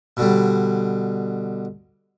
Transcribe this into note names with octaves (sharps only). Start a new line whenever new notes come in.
B2 D3 G3